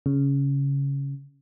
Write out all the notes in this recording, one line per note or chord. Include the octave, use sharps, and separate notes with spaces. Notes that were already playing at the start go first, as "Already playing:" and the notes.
C#3